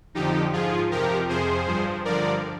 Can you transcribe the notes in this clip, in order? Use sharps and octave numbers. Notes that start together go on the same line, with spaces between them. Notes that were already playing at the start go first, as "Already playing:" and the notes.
F2 D3 F3 D#4 G4
G#2 F3 F4 G#4
F2 C3 F3 G4 A#4
F2 C3 F3 G#4 C5
G2 F3
G2 D3 F3 A#4 D5